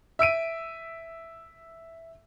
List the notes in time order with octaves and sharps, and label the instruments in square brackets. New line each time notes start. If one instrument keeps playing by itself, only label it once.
[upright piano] E5 E6 D7 D#7